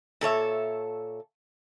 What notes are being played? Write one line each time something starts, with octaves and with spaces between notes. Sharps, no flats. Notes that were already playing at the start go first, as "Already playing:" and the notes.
A#2 A4 C#5 E5